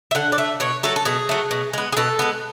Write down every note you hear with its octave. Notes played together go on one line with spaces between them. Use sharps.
E5
D3 F#5
D5
A3 E5
B2 C#5
F#3 A3 A4
A4
B2 G#4
F#3 A3
B2
G#3 B3
G#4
B2 A4
G#3 B3